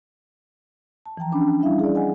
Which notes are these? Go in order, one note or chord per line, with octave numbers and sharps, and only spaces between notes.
A5
E3 F3 G5 A#5
C#4 D4 B5
G3 D4 E4 E5 F5
G#4 D5
D#5 F#5 G#5